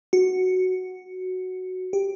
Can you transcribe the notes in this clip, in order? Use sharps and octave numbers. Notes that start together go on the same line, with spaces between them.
F#4
G4